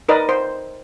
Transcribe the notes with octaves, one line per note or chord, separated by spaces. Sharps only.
D#4 A#4 B4 D5 D#5
C5